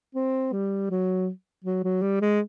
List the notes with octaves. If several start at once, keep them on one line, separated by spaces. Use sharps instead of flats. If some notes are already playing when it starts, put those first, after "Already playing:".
C4
G3
F#3
F#3
F#3
G3
G#3